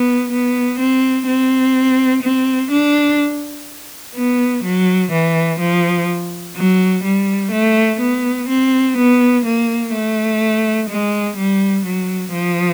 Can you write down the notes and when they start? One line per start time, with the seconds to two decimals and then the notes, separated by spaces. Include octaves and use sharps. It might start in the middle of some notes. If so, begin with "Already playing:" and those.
Already playing: B3
0.32 B3
0.80 C4
1.27 C4
2.23 C4
2.71 D4
4.15 B3
4.64 F#3
5.12 E3
5.59 F3
6.56 F#3
7.04 G3
7.52 A3
8.00 B3
8.49 C4
8.97 B3
9.45 A#3
9.93 A3
10.89 G#3
11.37 G3
11.85 F#3
12.33 F3